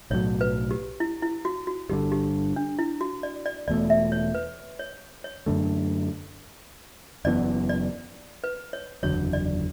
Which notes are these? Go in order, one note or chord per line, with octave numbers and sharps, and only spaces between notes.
B1 A2 F#3 C#5
B4
G4
E4
E4
F#4
F#4
G1 G2 D3 G4
G4
D4
E4
F#4
D5
D5
E1 E2 B2 A3 D5
E5
C#5
B4
C#5
C#5
F#2 D3 A3
F#1 F#2 E3 B3 D5
D5
B4
C#5
F#1 E2 D3 F#3 C#5
D5